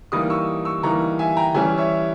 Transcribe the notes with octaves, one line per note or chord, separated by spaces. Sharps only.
E3 G3 A#3 D#4 B5 D#6
C#6 E6
C#6 E6
E3 G3 A#3 D#4 A#5 C#6
E5 G#5
G5 A#5
E3 G3 C#4 E4 E5 G#5
C#5 E5